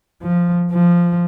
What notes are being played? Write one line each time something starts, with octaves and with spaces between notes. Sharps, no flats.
F3
F3